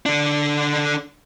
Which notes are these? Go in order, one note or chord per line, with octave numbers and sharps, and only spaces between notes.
D3 D4